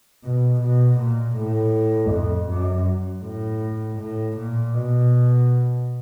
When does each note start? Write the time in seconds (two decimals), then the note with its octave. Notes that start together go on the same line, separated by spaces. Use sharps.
0.24 B2
0.61 B2
0.98 A#2
1.36 A2
2.11 F2
2.48 F#2
3.23 A2
3.99 A2
4.37 A#2
4.74 B2